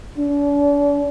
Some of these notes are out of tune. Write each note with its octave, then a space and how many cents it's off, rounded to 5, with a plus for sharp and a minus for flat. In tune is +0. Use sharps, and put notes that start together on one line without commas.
D4 -40